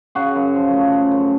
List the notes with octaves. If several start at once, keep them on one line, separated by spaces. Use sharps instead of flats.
C#3 F#4 G#4
F#2
F3
A3
C#3
F#2